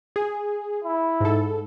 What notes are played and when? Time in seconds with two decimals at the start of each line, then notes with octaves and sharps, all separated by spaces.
0.16 G#4
0.84 E4
1.21 G#2 A4